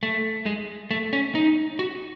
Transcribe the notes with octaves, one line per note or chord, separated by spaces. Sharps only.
A3
G#3
A3
C#4
D#4
F#4